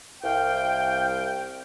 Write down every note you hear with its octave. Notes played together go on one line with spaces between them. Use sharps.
C2 F5 G5